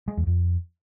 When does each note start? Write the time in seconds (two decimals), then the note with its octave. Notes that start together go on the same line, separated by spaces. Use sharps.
0.08 G#3
0.17 E2
0.27 F2